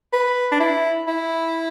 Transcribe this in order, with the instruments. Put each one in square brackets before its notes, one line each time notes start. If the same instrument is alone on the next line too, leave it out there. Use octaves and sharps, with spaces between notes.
[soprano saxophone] B4
D4
E4
E4